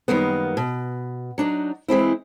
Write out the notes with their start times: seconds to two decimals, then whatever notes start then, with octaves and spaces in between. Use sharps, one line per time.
0.08 F#2 D#3 G3 A#3 B3
0.57 B2
1.38 F#3 D4 D#4
1.88 E3 G#3 C4 E4